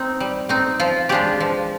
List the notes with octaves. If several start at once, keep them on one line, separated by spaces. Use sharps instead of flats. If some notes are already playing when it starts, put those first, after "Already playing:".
Already playing: C4 D#4
G3
C4 D#4
F3 F4
G#3 D4 F4 G4
F3